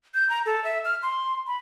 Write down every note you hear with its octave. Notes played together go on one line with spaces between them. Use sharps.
G6
A#5
A4
E5
F6
C6
B5